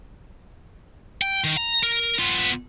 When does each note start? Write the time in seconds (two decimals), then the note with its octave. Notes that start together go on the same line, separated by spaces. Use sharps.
1.22 G5
1.44 D#3
1.57 A#5
1.83 A#4
2.19 B3 F4